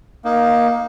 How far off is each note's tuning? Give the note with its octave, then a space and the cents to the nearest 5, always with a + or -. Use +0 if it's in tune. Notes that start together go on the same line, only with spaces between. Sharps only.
A#3 +15 D#4 +0